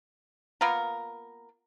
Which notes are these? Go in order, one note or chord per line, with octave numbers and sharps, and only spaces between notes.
A#3 B3 F4 A#4